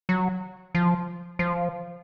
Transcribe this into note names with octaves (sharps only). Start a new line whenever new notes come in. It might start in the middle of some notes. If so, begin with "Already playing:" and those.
F#3
F3
F3